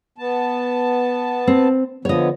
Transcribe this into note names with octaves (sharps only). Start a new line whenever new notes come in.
B3 A5
C4
D3 F3 B3 C#5 D#5